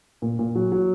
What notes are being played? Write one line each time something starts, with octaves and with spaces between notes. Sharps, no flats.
A#2
A#2
F#3
F#3